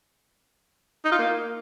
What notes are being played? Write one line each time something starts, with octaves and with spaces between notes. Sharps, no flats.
D#4
F4
A#3